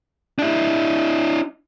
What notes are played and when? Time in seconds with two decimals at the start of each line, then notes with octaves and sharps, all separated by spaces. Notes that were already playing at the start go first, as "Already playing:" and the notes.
0.39 D4 E4